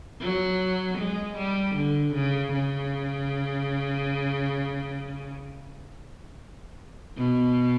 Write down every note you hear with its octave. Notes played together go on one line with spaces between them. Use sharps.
F#3
G#3
G3
D3
C#3
C#3
B2